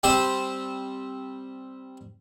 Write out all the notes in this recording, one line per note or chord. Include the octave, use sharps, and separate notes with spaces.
G3 C4 G4 C5